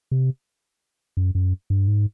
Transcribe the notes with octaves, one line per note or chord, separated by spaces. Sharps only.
C3
F#2
F#2
G2
G#2